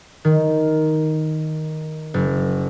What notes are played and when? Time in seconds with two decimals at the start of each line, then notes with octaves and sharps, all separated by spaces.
0.25 D#3
2.14 F#1